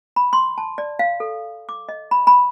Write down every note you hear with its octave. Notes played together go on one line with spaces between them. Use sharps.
B5
C6
A5
D5
F5
A4
D6
D#5
B5
B5